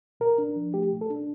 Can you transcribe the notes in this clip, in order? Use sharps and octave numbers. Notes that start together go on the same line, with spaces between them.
A#2 A#4
D4
F3
A3 G4
A#2
A4
D4